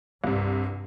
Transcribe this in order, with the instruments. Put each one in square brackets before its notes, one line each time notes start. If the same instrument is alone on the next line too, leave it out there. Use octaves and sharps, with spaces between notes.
[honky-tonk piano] C2 C3 [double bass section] G2